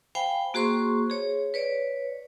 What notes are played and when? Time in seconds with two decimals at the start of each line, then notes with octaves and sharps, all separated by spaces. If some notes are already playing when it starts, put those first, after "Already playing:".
0.15 C5 F5 G5 G#5 B5
0.54 A#3 F#4 G#4 C5 C6 C#6
1.10 G#4 C#5
1.54 B4 C#5 D5